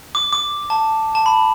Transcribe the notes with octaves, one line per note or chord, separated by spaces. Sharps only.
D6
D6
A5
A5
B5